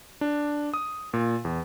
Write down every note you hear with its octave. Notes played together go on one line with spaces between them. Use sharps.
D4
D#6
A#2
E2